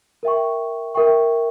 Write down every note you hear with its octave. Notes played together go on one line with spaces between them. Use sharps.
A#4 E5 G5 C#6
A#4 E5 G5 C#6